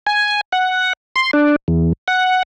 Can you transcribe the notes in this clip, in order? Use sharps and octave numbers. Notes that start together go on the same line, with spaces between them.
G#5
F#5
C6
D4
E2
F#5